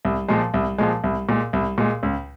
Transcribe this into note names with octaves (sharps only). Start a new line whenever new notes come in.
C2
A#2 F3 G#3
C2
A#2 F3 G#3
C2
A#2 G#3
C2
A#2 G#3
C#2